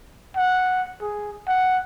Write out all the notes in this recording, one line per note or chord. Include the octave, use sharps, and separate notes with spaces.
F#5
G#4
F#5